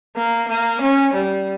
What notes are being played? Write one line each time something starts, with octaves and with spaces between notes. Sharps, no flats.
A#3
A#3
C#4
G3